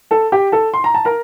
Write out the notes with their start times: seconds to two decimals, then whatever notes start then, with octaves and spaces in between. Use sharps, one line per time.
0.11 A4 A5
0.32 G4 G5
0.52 A4 A5
0.74 C6
0.84 A#5
0.94 A5
1.05 A#4 A#5